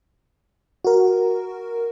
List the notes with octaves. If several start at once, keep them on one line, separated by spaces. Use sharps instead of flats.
F#4 A#4